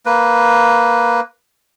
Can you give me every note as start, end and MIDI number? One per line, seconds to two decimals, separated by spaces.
0.06 1.21 58
0.06 1.21 71